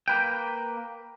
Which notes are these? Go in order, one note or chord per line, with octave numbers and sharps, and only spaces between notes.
A#3 B4 G5